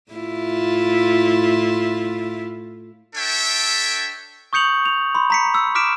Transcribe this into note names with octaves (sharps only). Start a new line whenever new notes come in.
A2 E4 F4
D4 A4 C#5 E5 G5
C#6 D#6 G6 C#7 F7 F#7
F7
B5 C6
A#5 B6 C#7
E6
D6 F6 B6 D7 E7